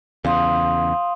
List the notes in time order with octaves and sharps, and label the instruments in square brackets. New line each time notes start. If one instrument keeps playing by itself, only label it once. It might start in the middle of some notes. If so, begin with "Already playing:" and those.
[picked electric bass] E2 C#3 [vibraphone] F5 C6 D#6